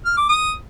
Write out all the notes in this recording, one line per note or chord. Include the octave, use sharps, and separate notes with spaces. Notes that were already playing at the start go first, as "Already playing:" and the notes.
F6
D6
D#6